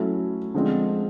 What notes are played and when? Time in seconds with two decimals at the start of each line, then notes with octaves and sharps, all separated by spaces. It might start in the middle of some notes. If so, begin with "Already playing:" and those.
Already playing: F#3 A3 C#4 E4
0.54 D3 F3 G#3 C4